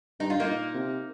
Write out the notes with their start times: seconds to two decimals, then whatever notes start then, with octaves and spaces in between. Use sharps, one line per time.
0.20 G2 D#4
0.30 F4
0.36 G2 A#3 D#4
0.47 A#2
0.74 C3